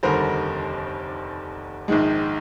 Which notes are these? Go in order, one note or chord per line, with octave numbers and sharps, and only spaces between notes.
F1 D#2 D3 G3 A#4 C5
A#1 G#2 D#3 G#3